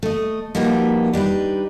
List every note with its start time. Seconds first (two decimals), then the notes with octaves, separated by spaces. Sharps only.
0.03 A3 D#5
0.55 F3 G3 A#3 D#4 F#4 B4
1.13 G3 D4 D#4 B4